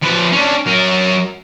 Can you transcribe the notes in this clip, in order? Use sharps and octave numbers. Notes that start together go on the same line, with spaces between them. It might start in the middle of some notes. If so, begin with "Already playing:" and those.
F3 B4
C#4 D4
F#3 A#4